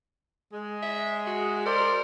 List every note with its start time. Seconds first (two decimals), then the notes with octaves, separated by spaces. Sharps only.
0.52 G#3
0.83 E5
1.27 F#4
1.66 A#4 C5 D5